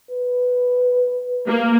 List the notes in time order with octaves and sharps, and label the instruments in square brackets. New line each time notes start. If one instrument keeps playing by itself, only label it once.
[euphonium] B4
[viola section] A#3